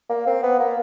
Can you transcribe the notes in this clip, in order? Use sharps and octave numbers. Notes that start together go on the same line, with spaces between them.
A#3
C4
B3
A#3